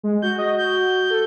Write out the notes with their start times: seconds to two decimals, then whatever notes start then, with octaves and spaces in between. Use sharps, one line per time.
0.03 G#3
0.22 F#4 G6
0.38 D#5
0.58 G6
1.10 A4